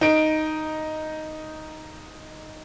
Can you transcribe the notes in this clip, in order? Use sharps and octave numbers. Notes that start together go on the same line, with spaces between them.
D#4 D7